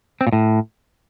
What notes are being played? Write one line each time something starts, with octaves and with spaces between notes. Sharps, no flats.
C4
A#2
A2